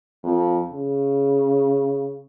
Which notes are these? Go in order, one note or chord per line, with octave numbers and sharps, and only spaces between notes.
F2
C#3